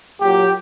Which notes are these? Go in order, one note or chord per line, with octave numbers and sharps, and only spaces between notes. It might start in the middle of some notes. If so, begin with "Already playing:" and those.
A#2 F#3 G4